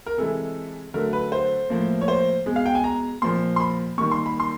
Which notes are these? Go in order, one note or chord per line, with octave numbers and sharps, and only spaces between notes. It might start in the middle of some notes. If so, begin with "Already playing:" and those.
A#4
C3 E3 G#3 A4
D3 F#3 A3 A#4
B4
C5
A2 F3 A#3
C#5
C5
B2 G#3
F5
G5
G#5
A#5
A#2 F3 A#3 C6
C6
B5
D#3 G3 A#3 C#6
C6
B5
C6